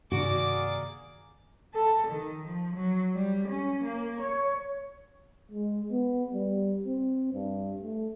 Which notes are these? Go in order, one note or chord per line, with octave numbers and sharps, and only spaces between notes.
G2 C3 D#3 A#3 F#4 G#4 D5 D6
A4
D#3
F3
F#3
G3
C#4
A#3
C#5
G#3
B3
G3
C4
G2
A3